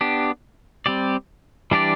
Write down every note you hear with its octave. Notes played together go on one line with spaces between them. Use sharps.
B3 D4 G4
G3 C4 G4 D5
E3 G3 D4 G4 D5